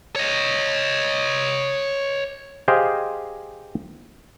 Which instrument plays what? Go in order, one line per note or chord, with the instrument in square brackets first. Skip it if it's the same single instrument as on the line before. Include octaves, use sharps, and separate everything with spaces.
[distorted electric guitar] C#5 D#5
[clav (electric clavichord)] G4 G#4 C5 D#5 F5